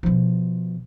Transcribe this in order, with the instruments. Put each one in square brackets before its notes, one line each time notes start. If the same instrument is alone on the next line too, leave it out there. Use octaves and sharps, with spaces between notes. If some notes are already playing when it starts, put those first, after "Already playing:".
[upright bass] B2 F3